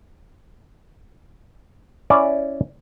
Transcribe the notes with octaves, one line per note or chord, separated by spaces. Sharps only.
C#4 E4 D5